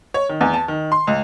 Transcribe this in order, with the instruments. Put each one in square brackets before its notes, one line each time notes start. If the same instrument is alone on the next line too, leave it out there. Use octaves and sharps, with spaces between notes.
[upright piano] C#5
D#3
E2
A5
D#3
C6
C#2